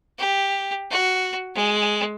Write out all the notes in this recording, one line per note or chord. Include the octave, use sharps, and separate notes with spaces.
G4
F#4
G#3